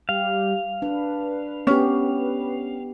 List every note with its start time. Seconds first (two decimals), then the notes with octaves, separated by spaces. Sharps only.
0.09 G3 G4 F5
0.82 D4 B4
1.67 B3 C#4 G4